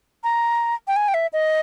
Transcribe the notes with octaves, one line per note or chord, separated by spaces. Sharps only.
A#5
G5
G#5
G5
E5
D#5